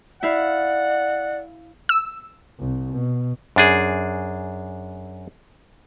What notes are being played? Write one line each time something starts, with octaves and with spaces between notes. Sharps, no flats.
E4 D5 F5 F#5
E6
C2
B2
F#2 D4 G#4